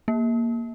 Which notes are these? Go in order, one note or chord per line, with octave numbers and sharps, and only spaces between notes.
A#3